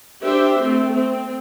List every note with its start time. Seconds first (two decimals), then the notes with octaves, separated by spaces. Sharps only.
0.25 D4 G4 C5 E5
0.62 A3 C4
0.94 C4